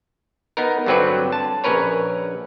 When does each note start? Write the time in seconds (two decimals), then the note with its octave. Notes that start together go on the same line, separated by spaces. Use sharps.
0.57 B3 D#4 A#4
0.86 G2 D3 F#3 C4 B4 D5
1.32 A5
1.64 A#1 C#4 A#4 B4 C#5